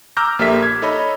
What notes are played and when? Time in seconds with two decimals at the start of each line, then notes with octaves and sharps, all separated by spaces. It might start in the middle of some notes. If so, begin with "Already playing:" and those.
0.17 A#5 D6 E6 F6 G6 A#6
0.39 A#1 A#3 G4 A4 E5 B6
0.62 G#6
0.82 D#4 A4 C#5 D#5 B5